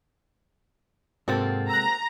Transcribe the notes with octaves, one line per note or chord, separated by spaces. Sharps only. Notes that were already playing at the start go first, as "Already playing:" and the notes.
G#2 C3 G#3 A#3 C4 F#4 A4 A6
A#5 E6 F#6